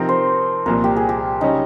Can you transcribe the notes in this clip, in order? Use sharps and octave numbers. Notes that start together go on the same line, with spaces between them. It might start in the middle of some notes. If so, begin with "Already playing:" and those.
Already playing: C3 F3 C4 D#4 A#4
C5
C2 A#2 F3 A#4
G4
G#4
G4
C#3 G3 C#4 D#4